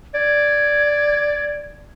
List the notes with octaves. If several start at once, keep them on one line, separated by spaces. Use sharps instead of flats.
D5 G#6